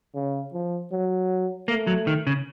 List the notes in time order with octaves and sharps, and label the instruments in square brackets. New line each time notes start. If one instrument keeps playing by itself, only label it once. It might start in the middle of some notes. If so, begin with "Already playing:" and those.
[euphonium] C#3
F3
F#3
[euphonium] A3 [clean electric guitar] A#3
[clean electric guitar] F#3
D#3
C#3